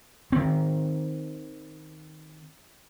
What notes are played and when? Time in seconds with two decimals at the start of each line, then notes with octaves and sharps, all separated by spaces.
0.32 D#3 C4